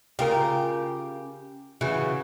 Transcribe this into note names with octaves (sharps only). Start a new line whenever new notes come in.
C#3 F4 G4 A#4
C#3 E3 F#4